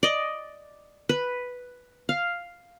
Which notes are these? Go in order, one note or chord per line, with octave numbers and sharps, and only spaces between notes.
D5 D#5
B4
F5